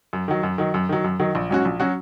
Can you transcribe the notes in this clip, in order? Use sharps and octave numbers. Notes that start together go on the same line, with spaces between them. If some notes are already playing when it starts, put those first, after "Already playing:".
F#2
D#3 F#3
F#2
D#3 F#3
F#2
D#3 F#3
F#2
D#3 F#3
A#1
G#2 F#3 C#4 F#4
A#1
F#3 C#4 F#4